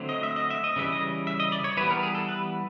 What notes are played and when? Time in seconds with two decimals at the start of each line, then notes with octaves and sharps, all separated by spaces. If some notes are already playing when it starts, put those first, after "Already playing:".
Already playing: D3 F#3 A3 C4
0.09 D#5
0.23 E5
0.36 D#5
0.50 E5
0.64 D#5
0.76 C#3 E3 G3 E5
0.92 D#5
1.27 E5
1.40 D#5
1.52 D5
1.64 C#5
1.77 E3 G3 B3 B4
1.90 A#4
2.03 G#4
2.15 A4
2.29 B4